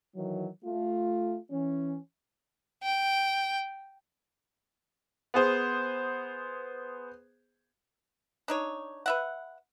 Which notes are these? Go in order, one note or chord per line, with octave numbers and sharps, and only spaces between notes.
D#3 E3 F#3
A3 F4
E3 C#4
G5
B3 G#4 C5
D4 D#4 C#5
B4 E5 F#5